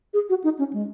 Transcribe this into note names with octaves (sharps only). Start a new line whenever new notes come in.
G#4
F#4
D#4
C#4
G#3